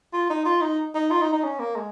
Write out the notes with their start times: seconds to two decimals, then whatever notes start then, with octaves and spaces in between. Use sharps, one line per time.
0.13 F4
0.30 D#4
0.45 F4
0.61 D#4
0.95 D#4
1.11 F4
1.21 D#4
1.33 D#4
1.44 C#4
1.59 A#3
1.76 G#3